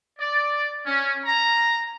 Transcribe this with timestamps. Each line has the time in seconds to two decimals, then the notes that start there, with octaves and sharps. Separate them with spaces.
0.19 D5
0.86 C#4
1.26 A#5